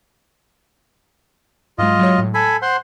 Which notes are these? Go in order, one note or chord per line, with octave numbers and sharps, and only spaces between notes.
G#2 F#3 G#3 F4 D#5
F#3 G#3 C#5
A2
A4 G#5 B5 G6 C7
C5 F#5 C6